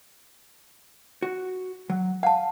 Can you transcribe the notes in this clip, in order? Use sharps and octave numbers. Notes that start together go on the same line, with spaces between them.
F#4
F#3
F5 F#5 A5